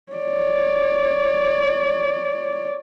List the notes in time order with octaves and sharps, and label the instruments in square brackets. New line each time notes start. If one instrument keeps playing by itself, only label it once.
[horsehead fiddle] C#5 D5